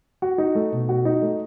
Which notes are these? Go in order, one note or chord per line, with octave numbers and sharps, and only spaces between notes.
F#4
D#4
A3
B2
F#4
D#4
A3